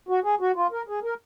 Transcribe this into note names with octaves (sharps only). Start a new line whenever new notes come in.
F#4
G#4
F#4
F4
A#4
G#4
A#4